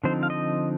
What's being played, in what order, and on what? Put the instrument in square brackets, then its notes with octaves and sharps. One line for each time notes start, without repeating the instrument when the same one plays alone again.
[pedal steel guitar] D3 F3 C4 D#4 C5
F5
D#5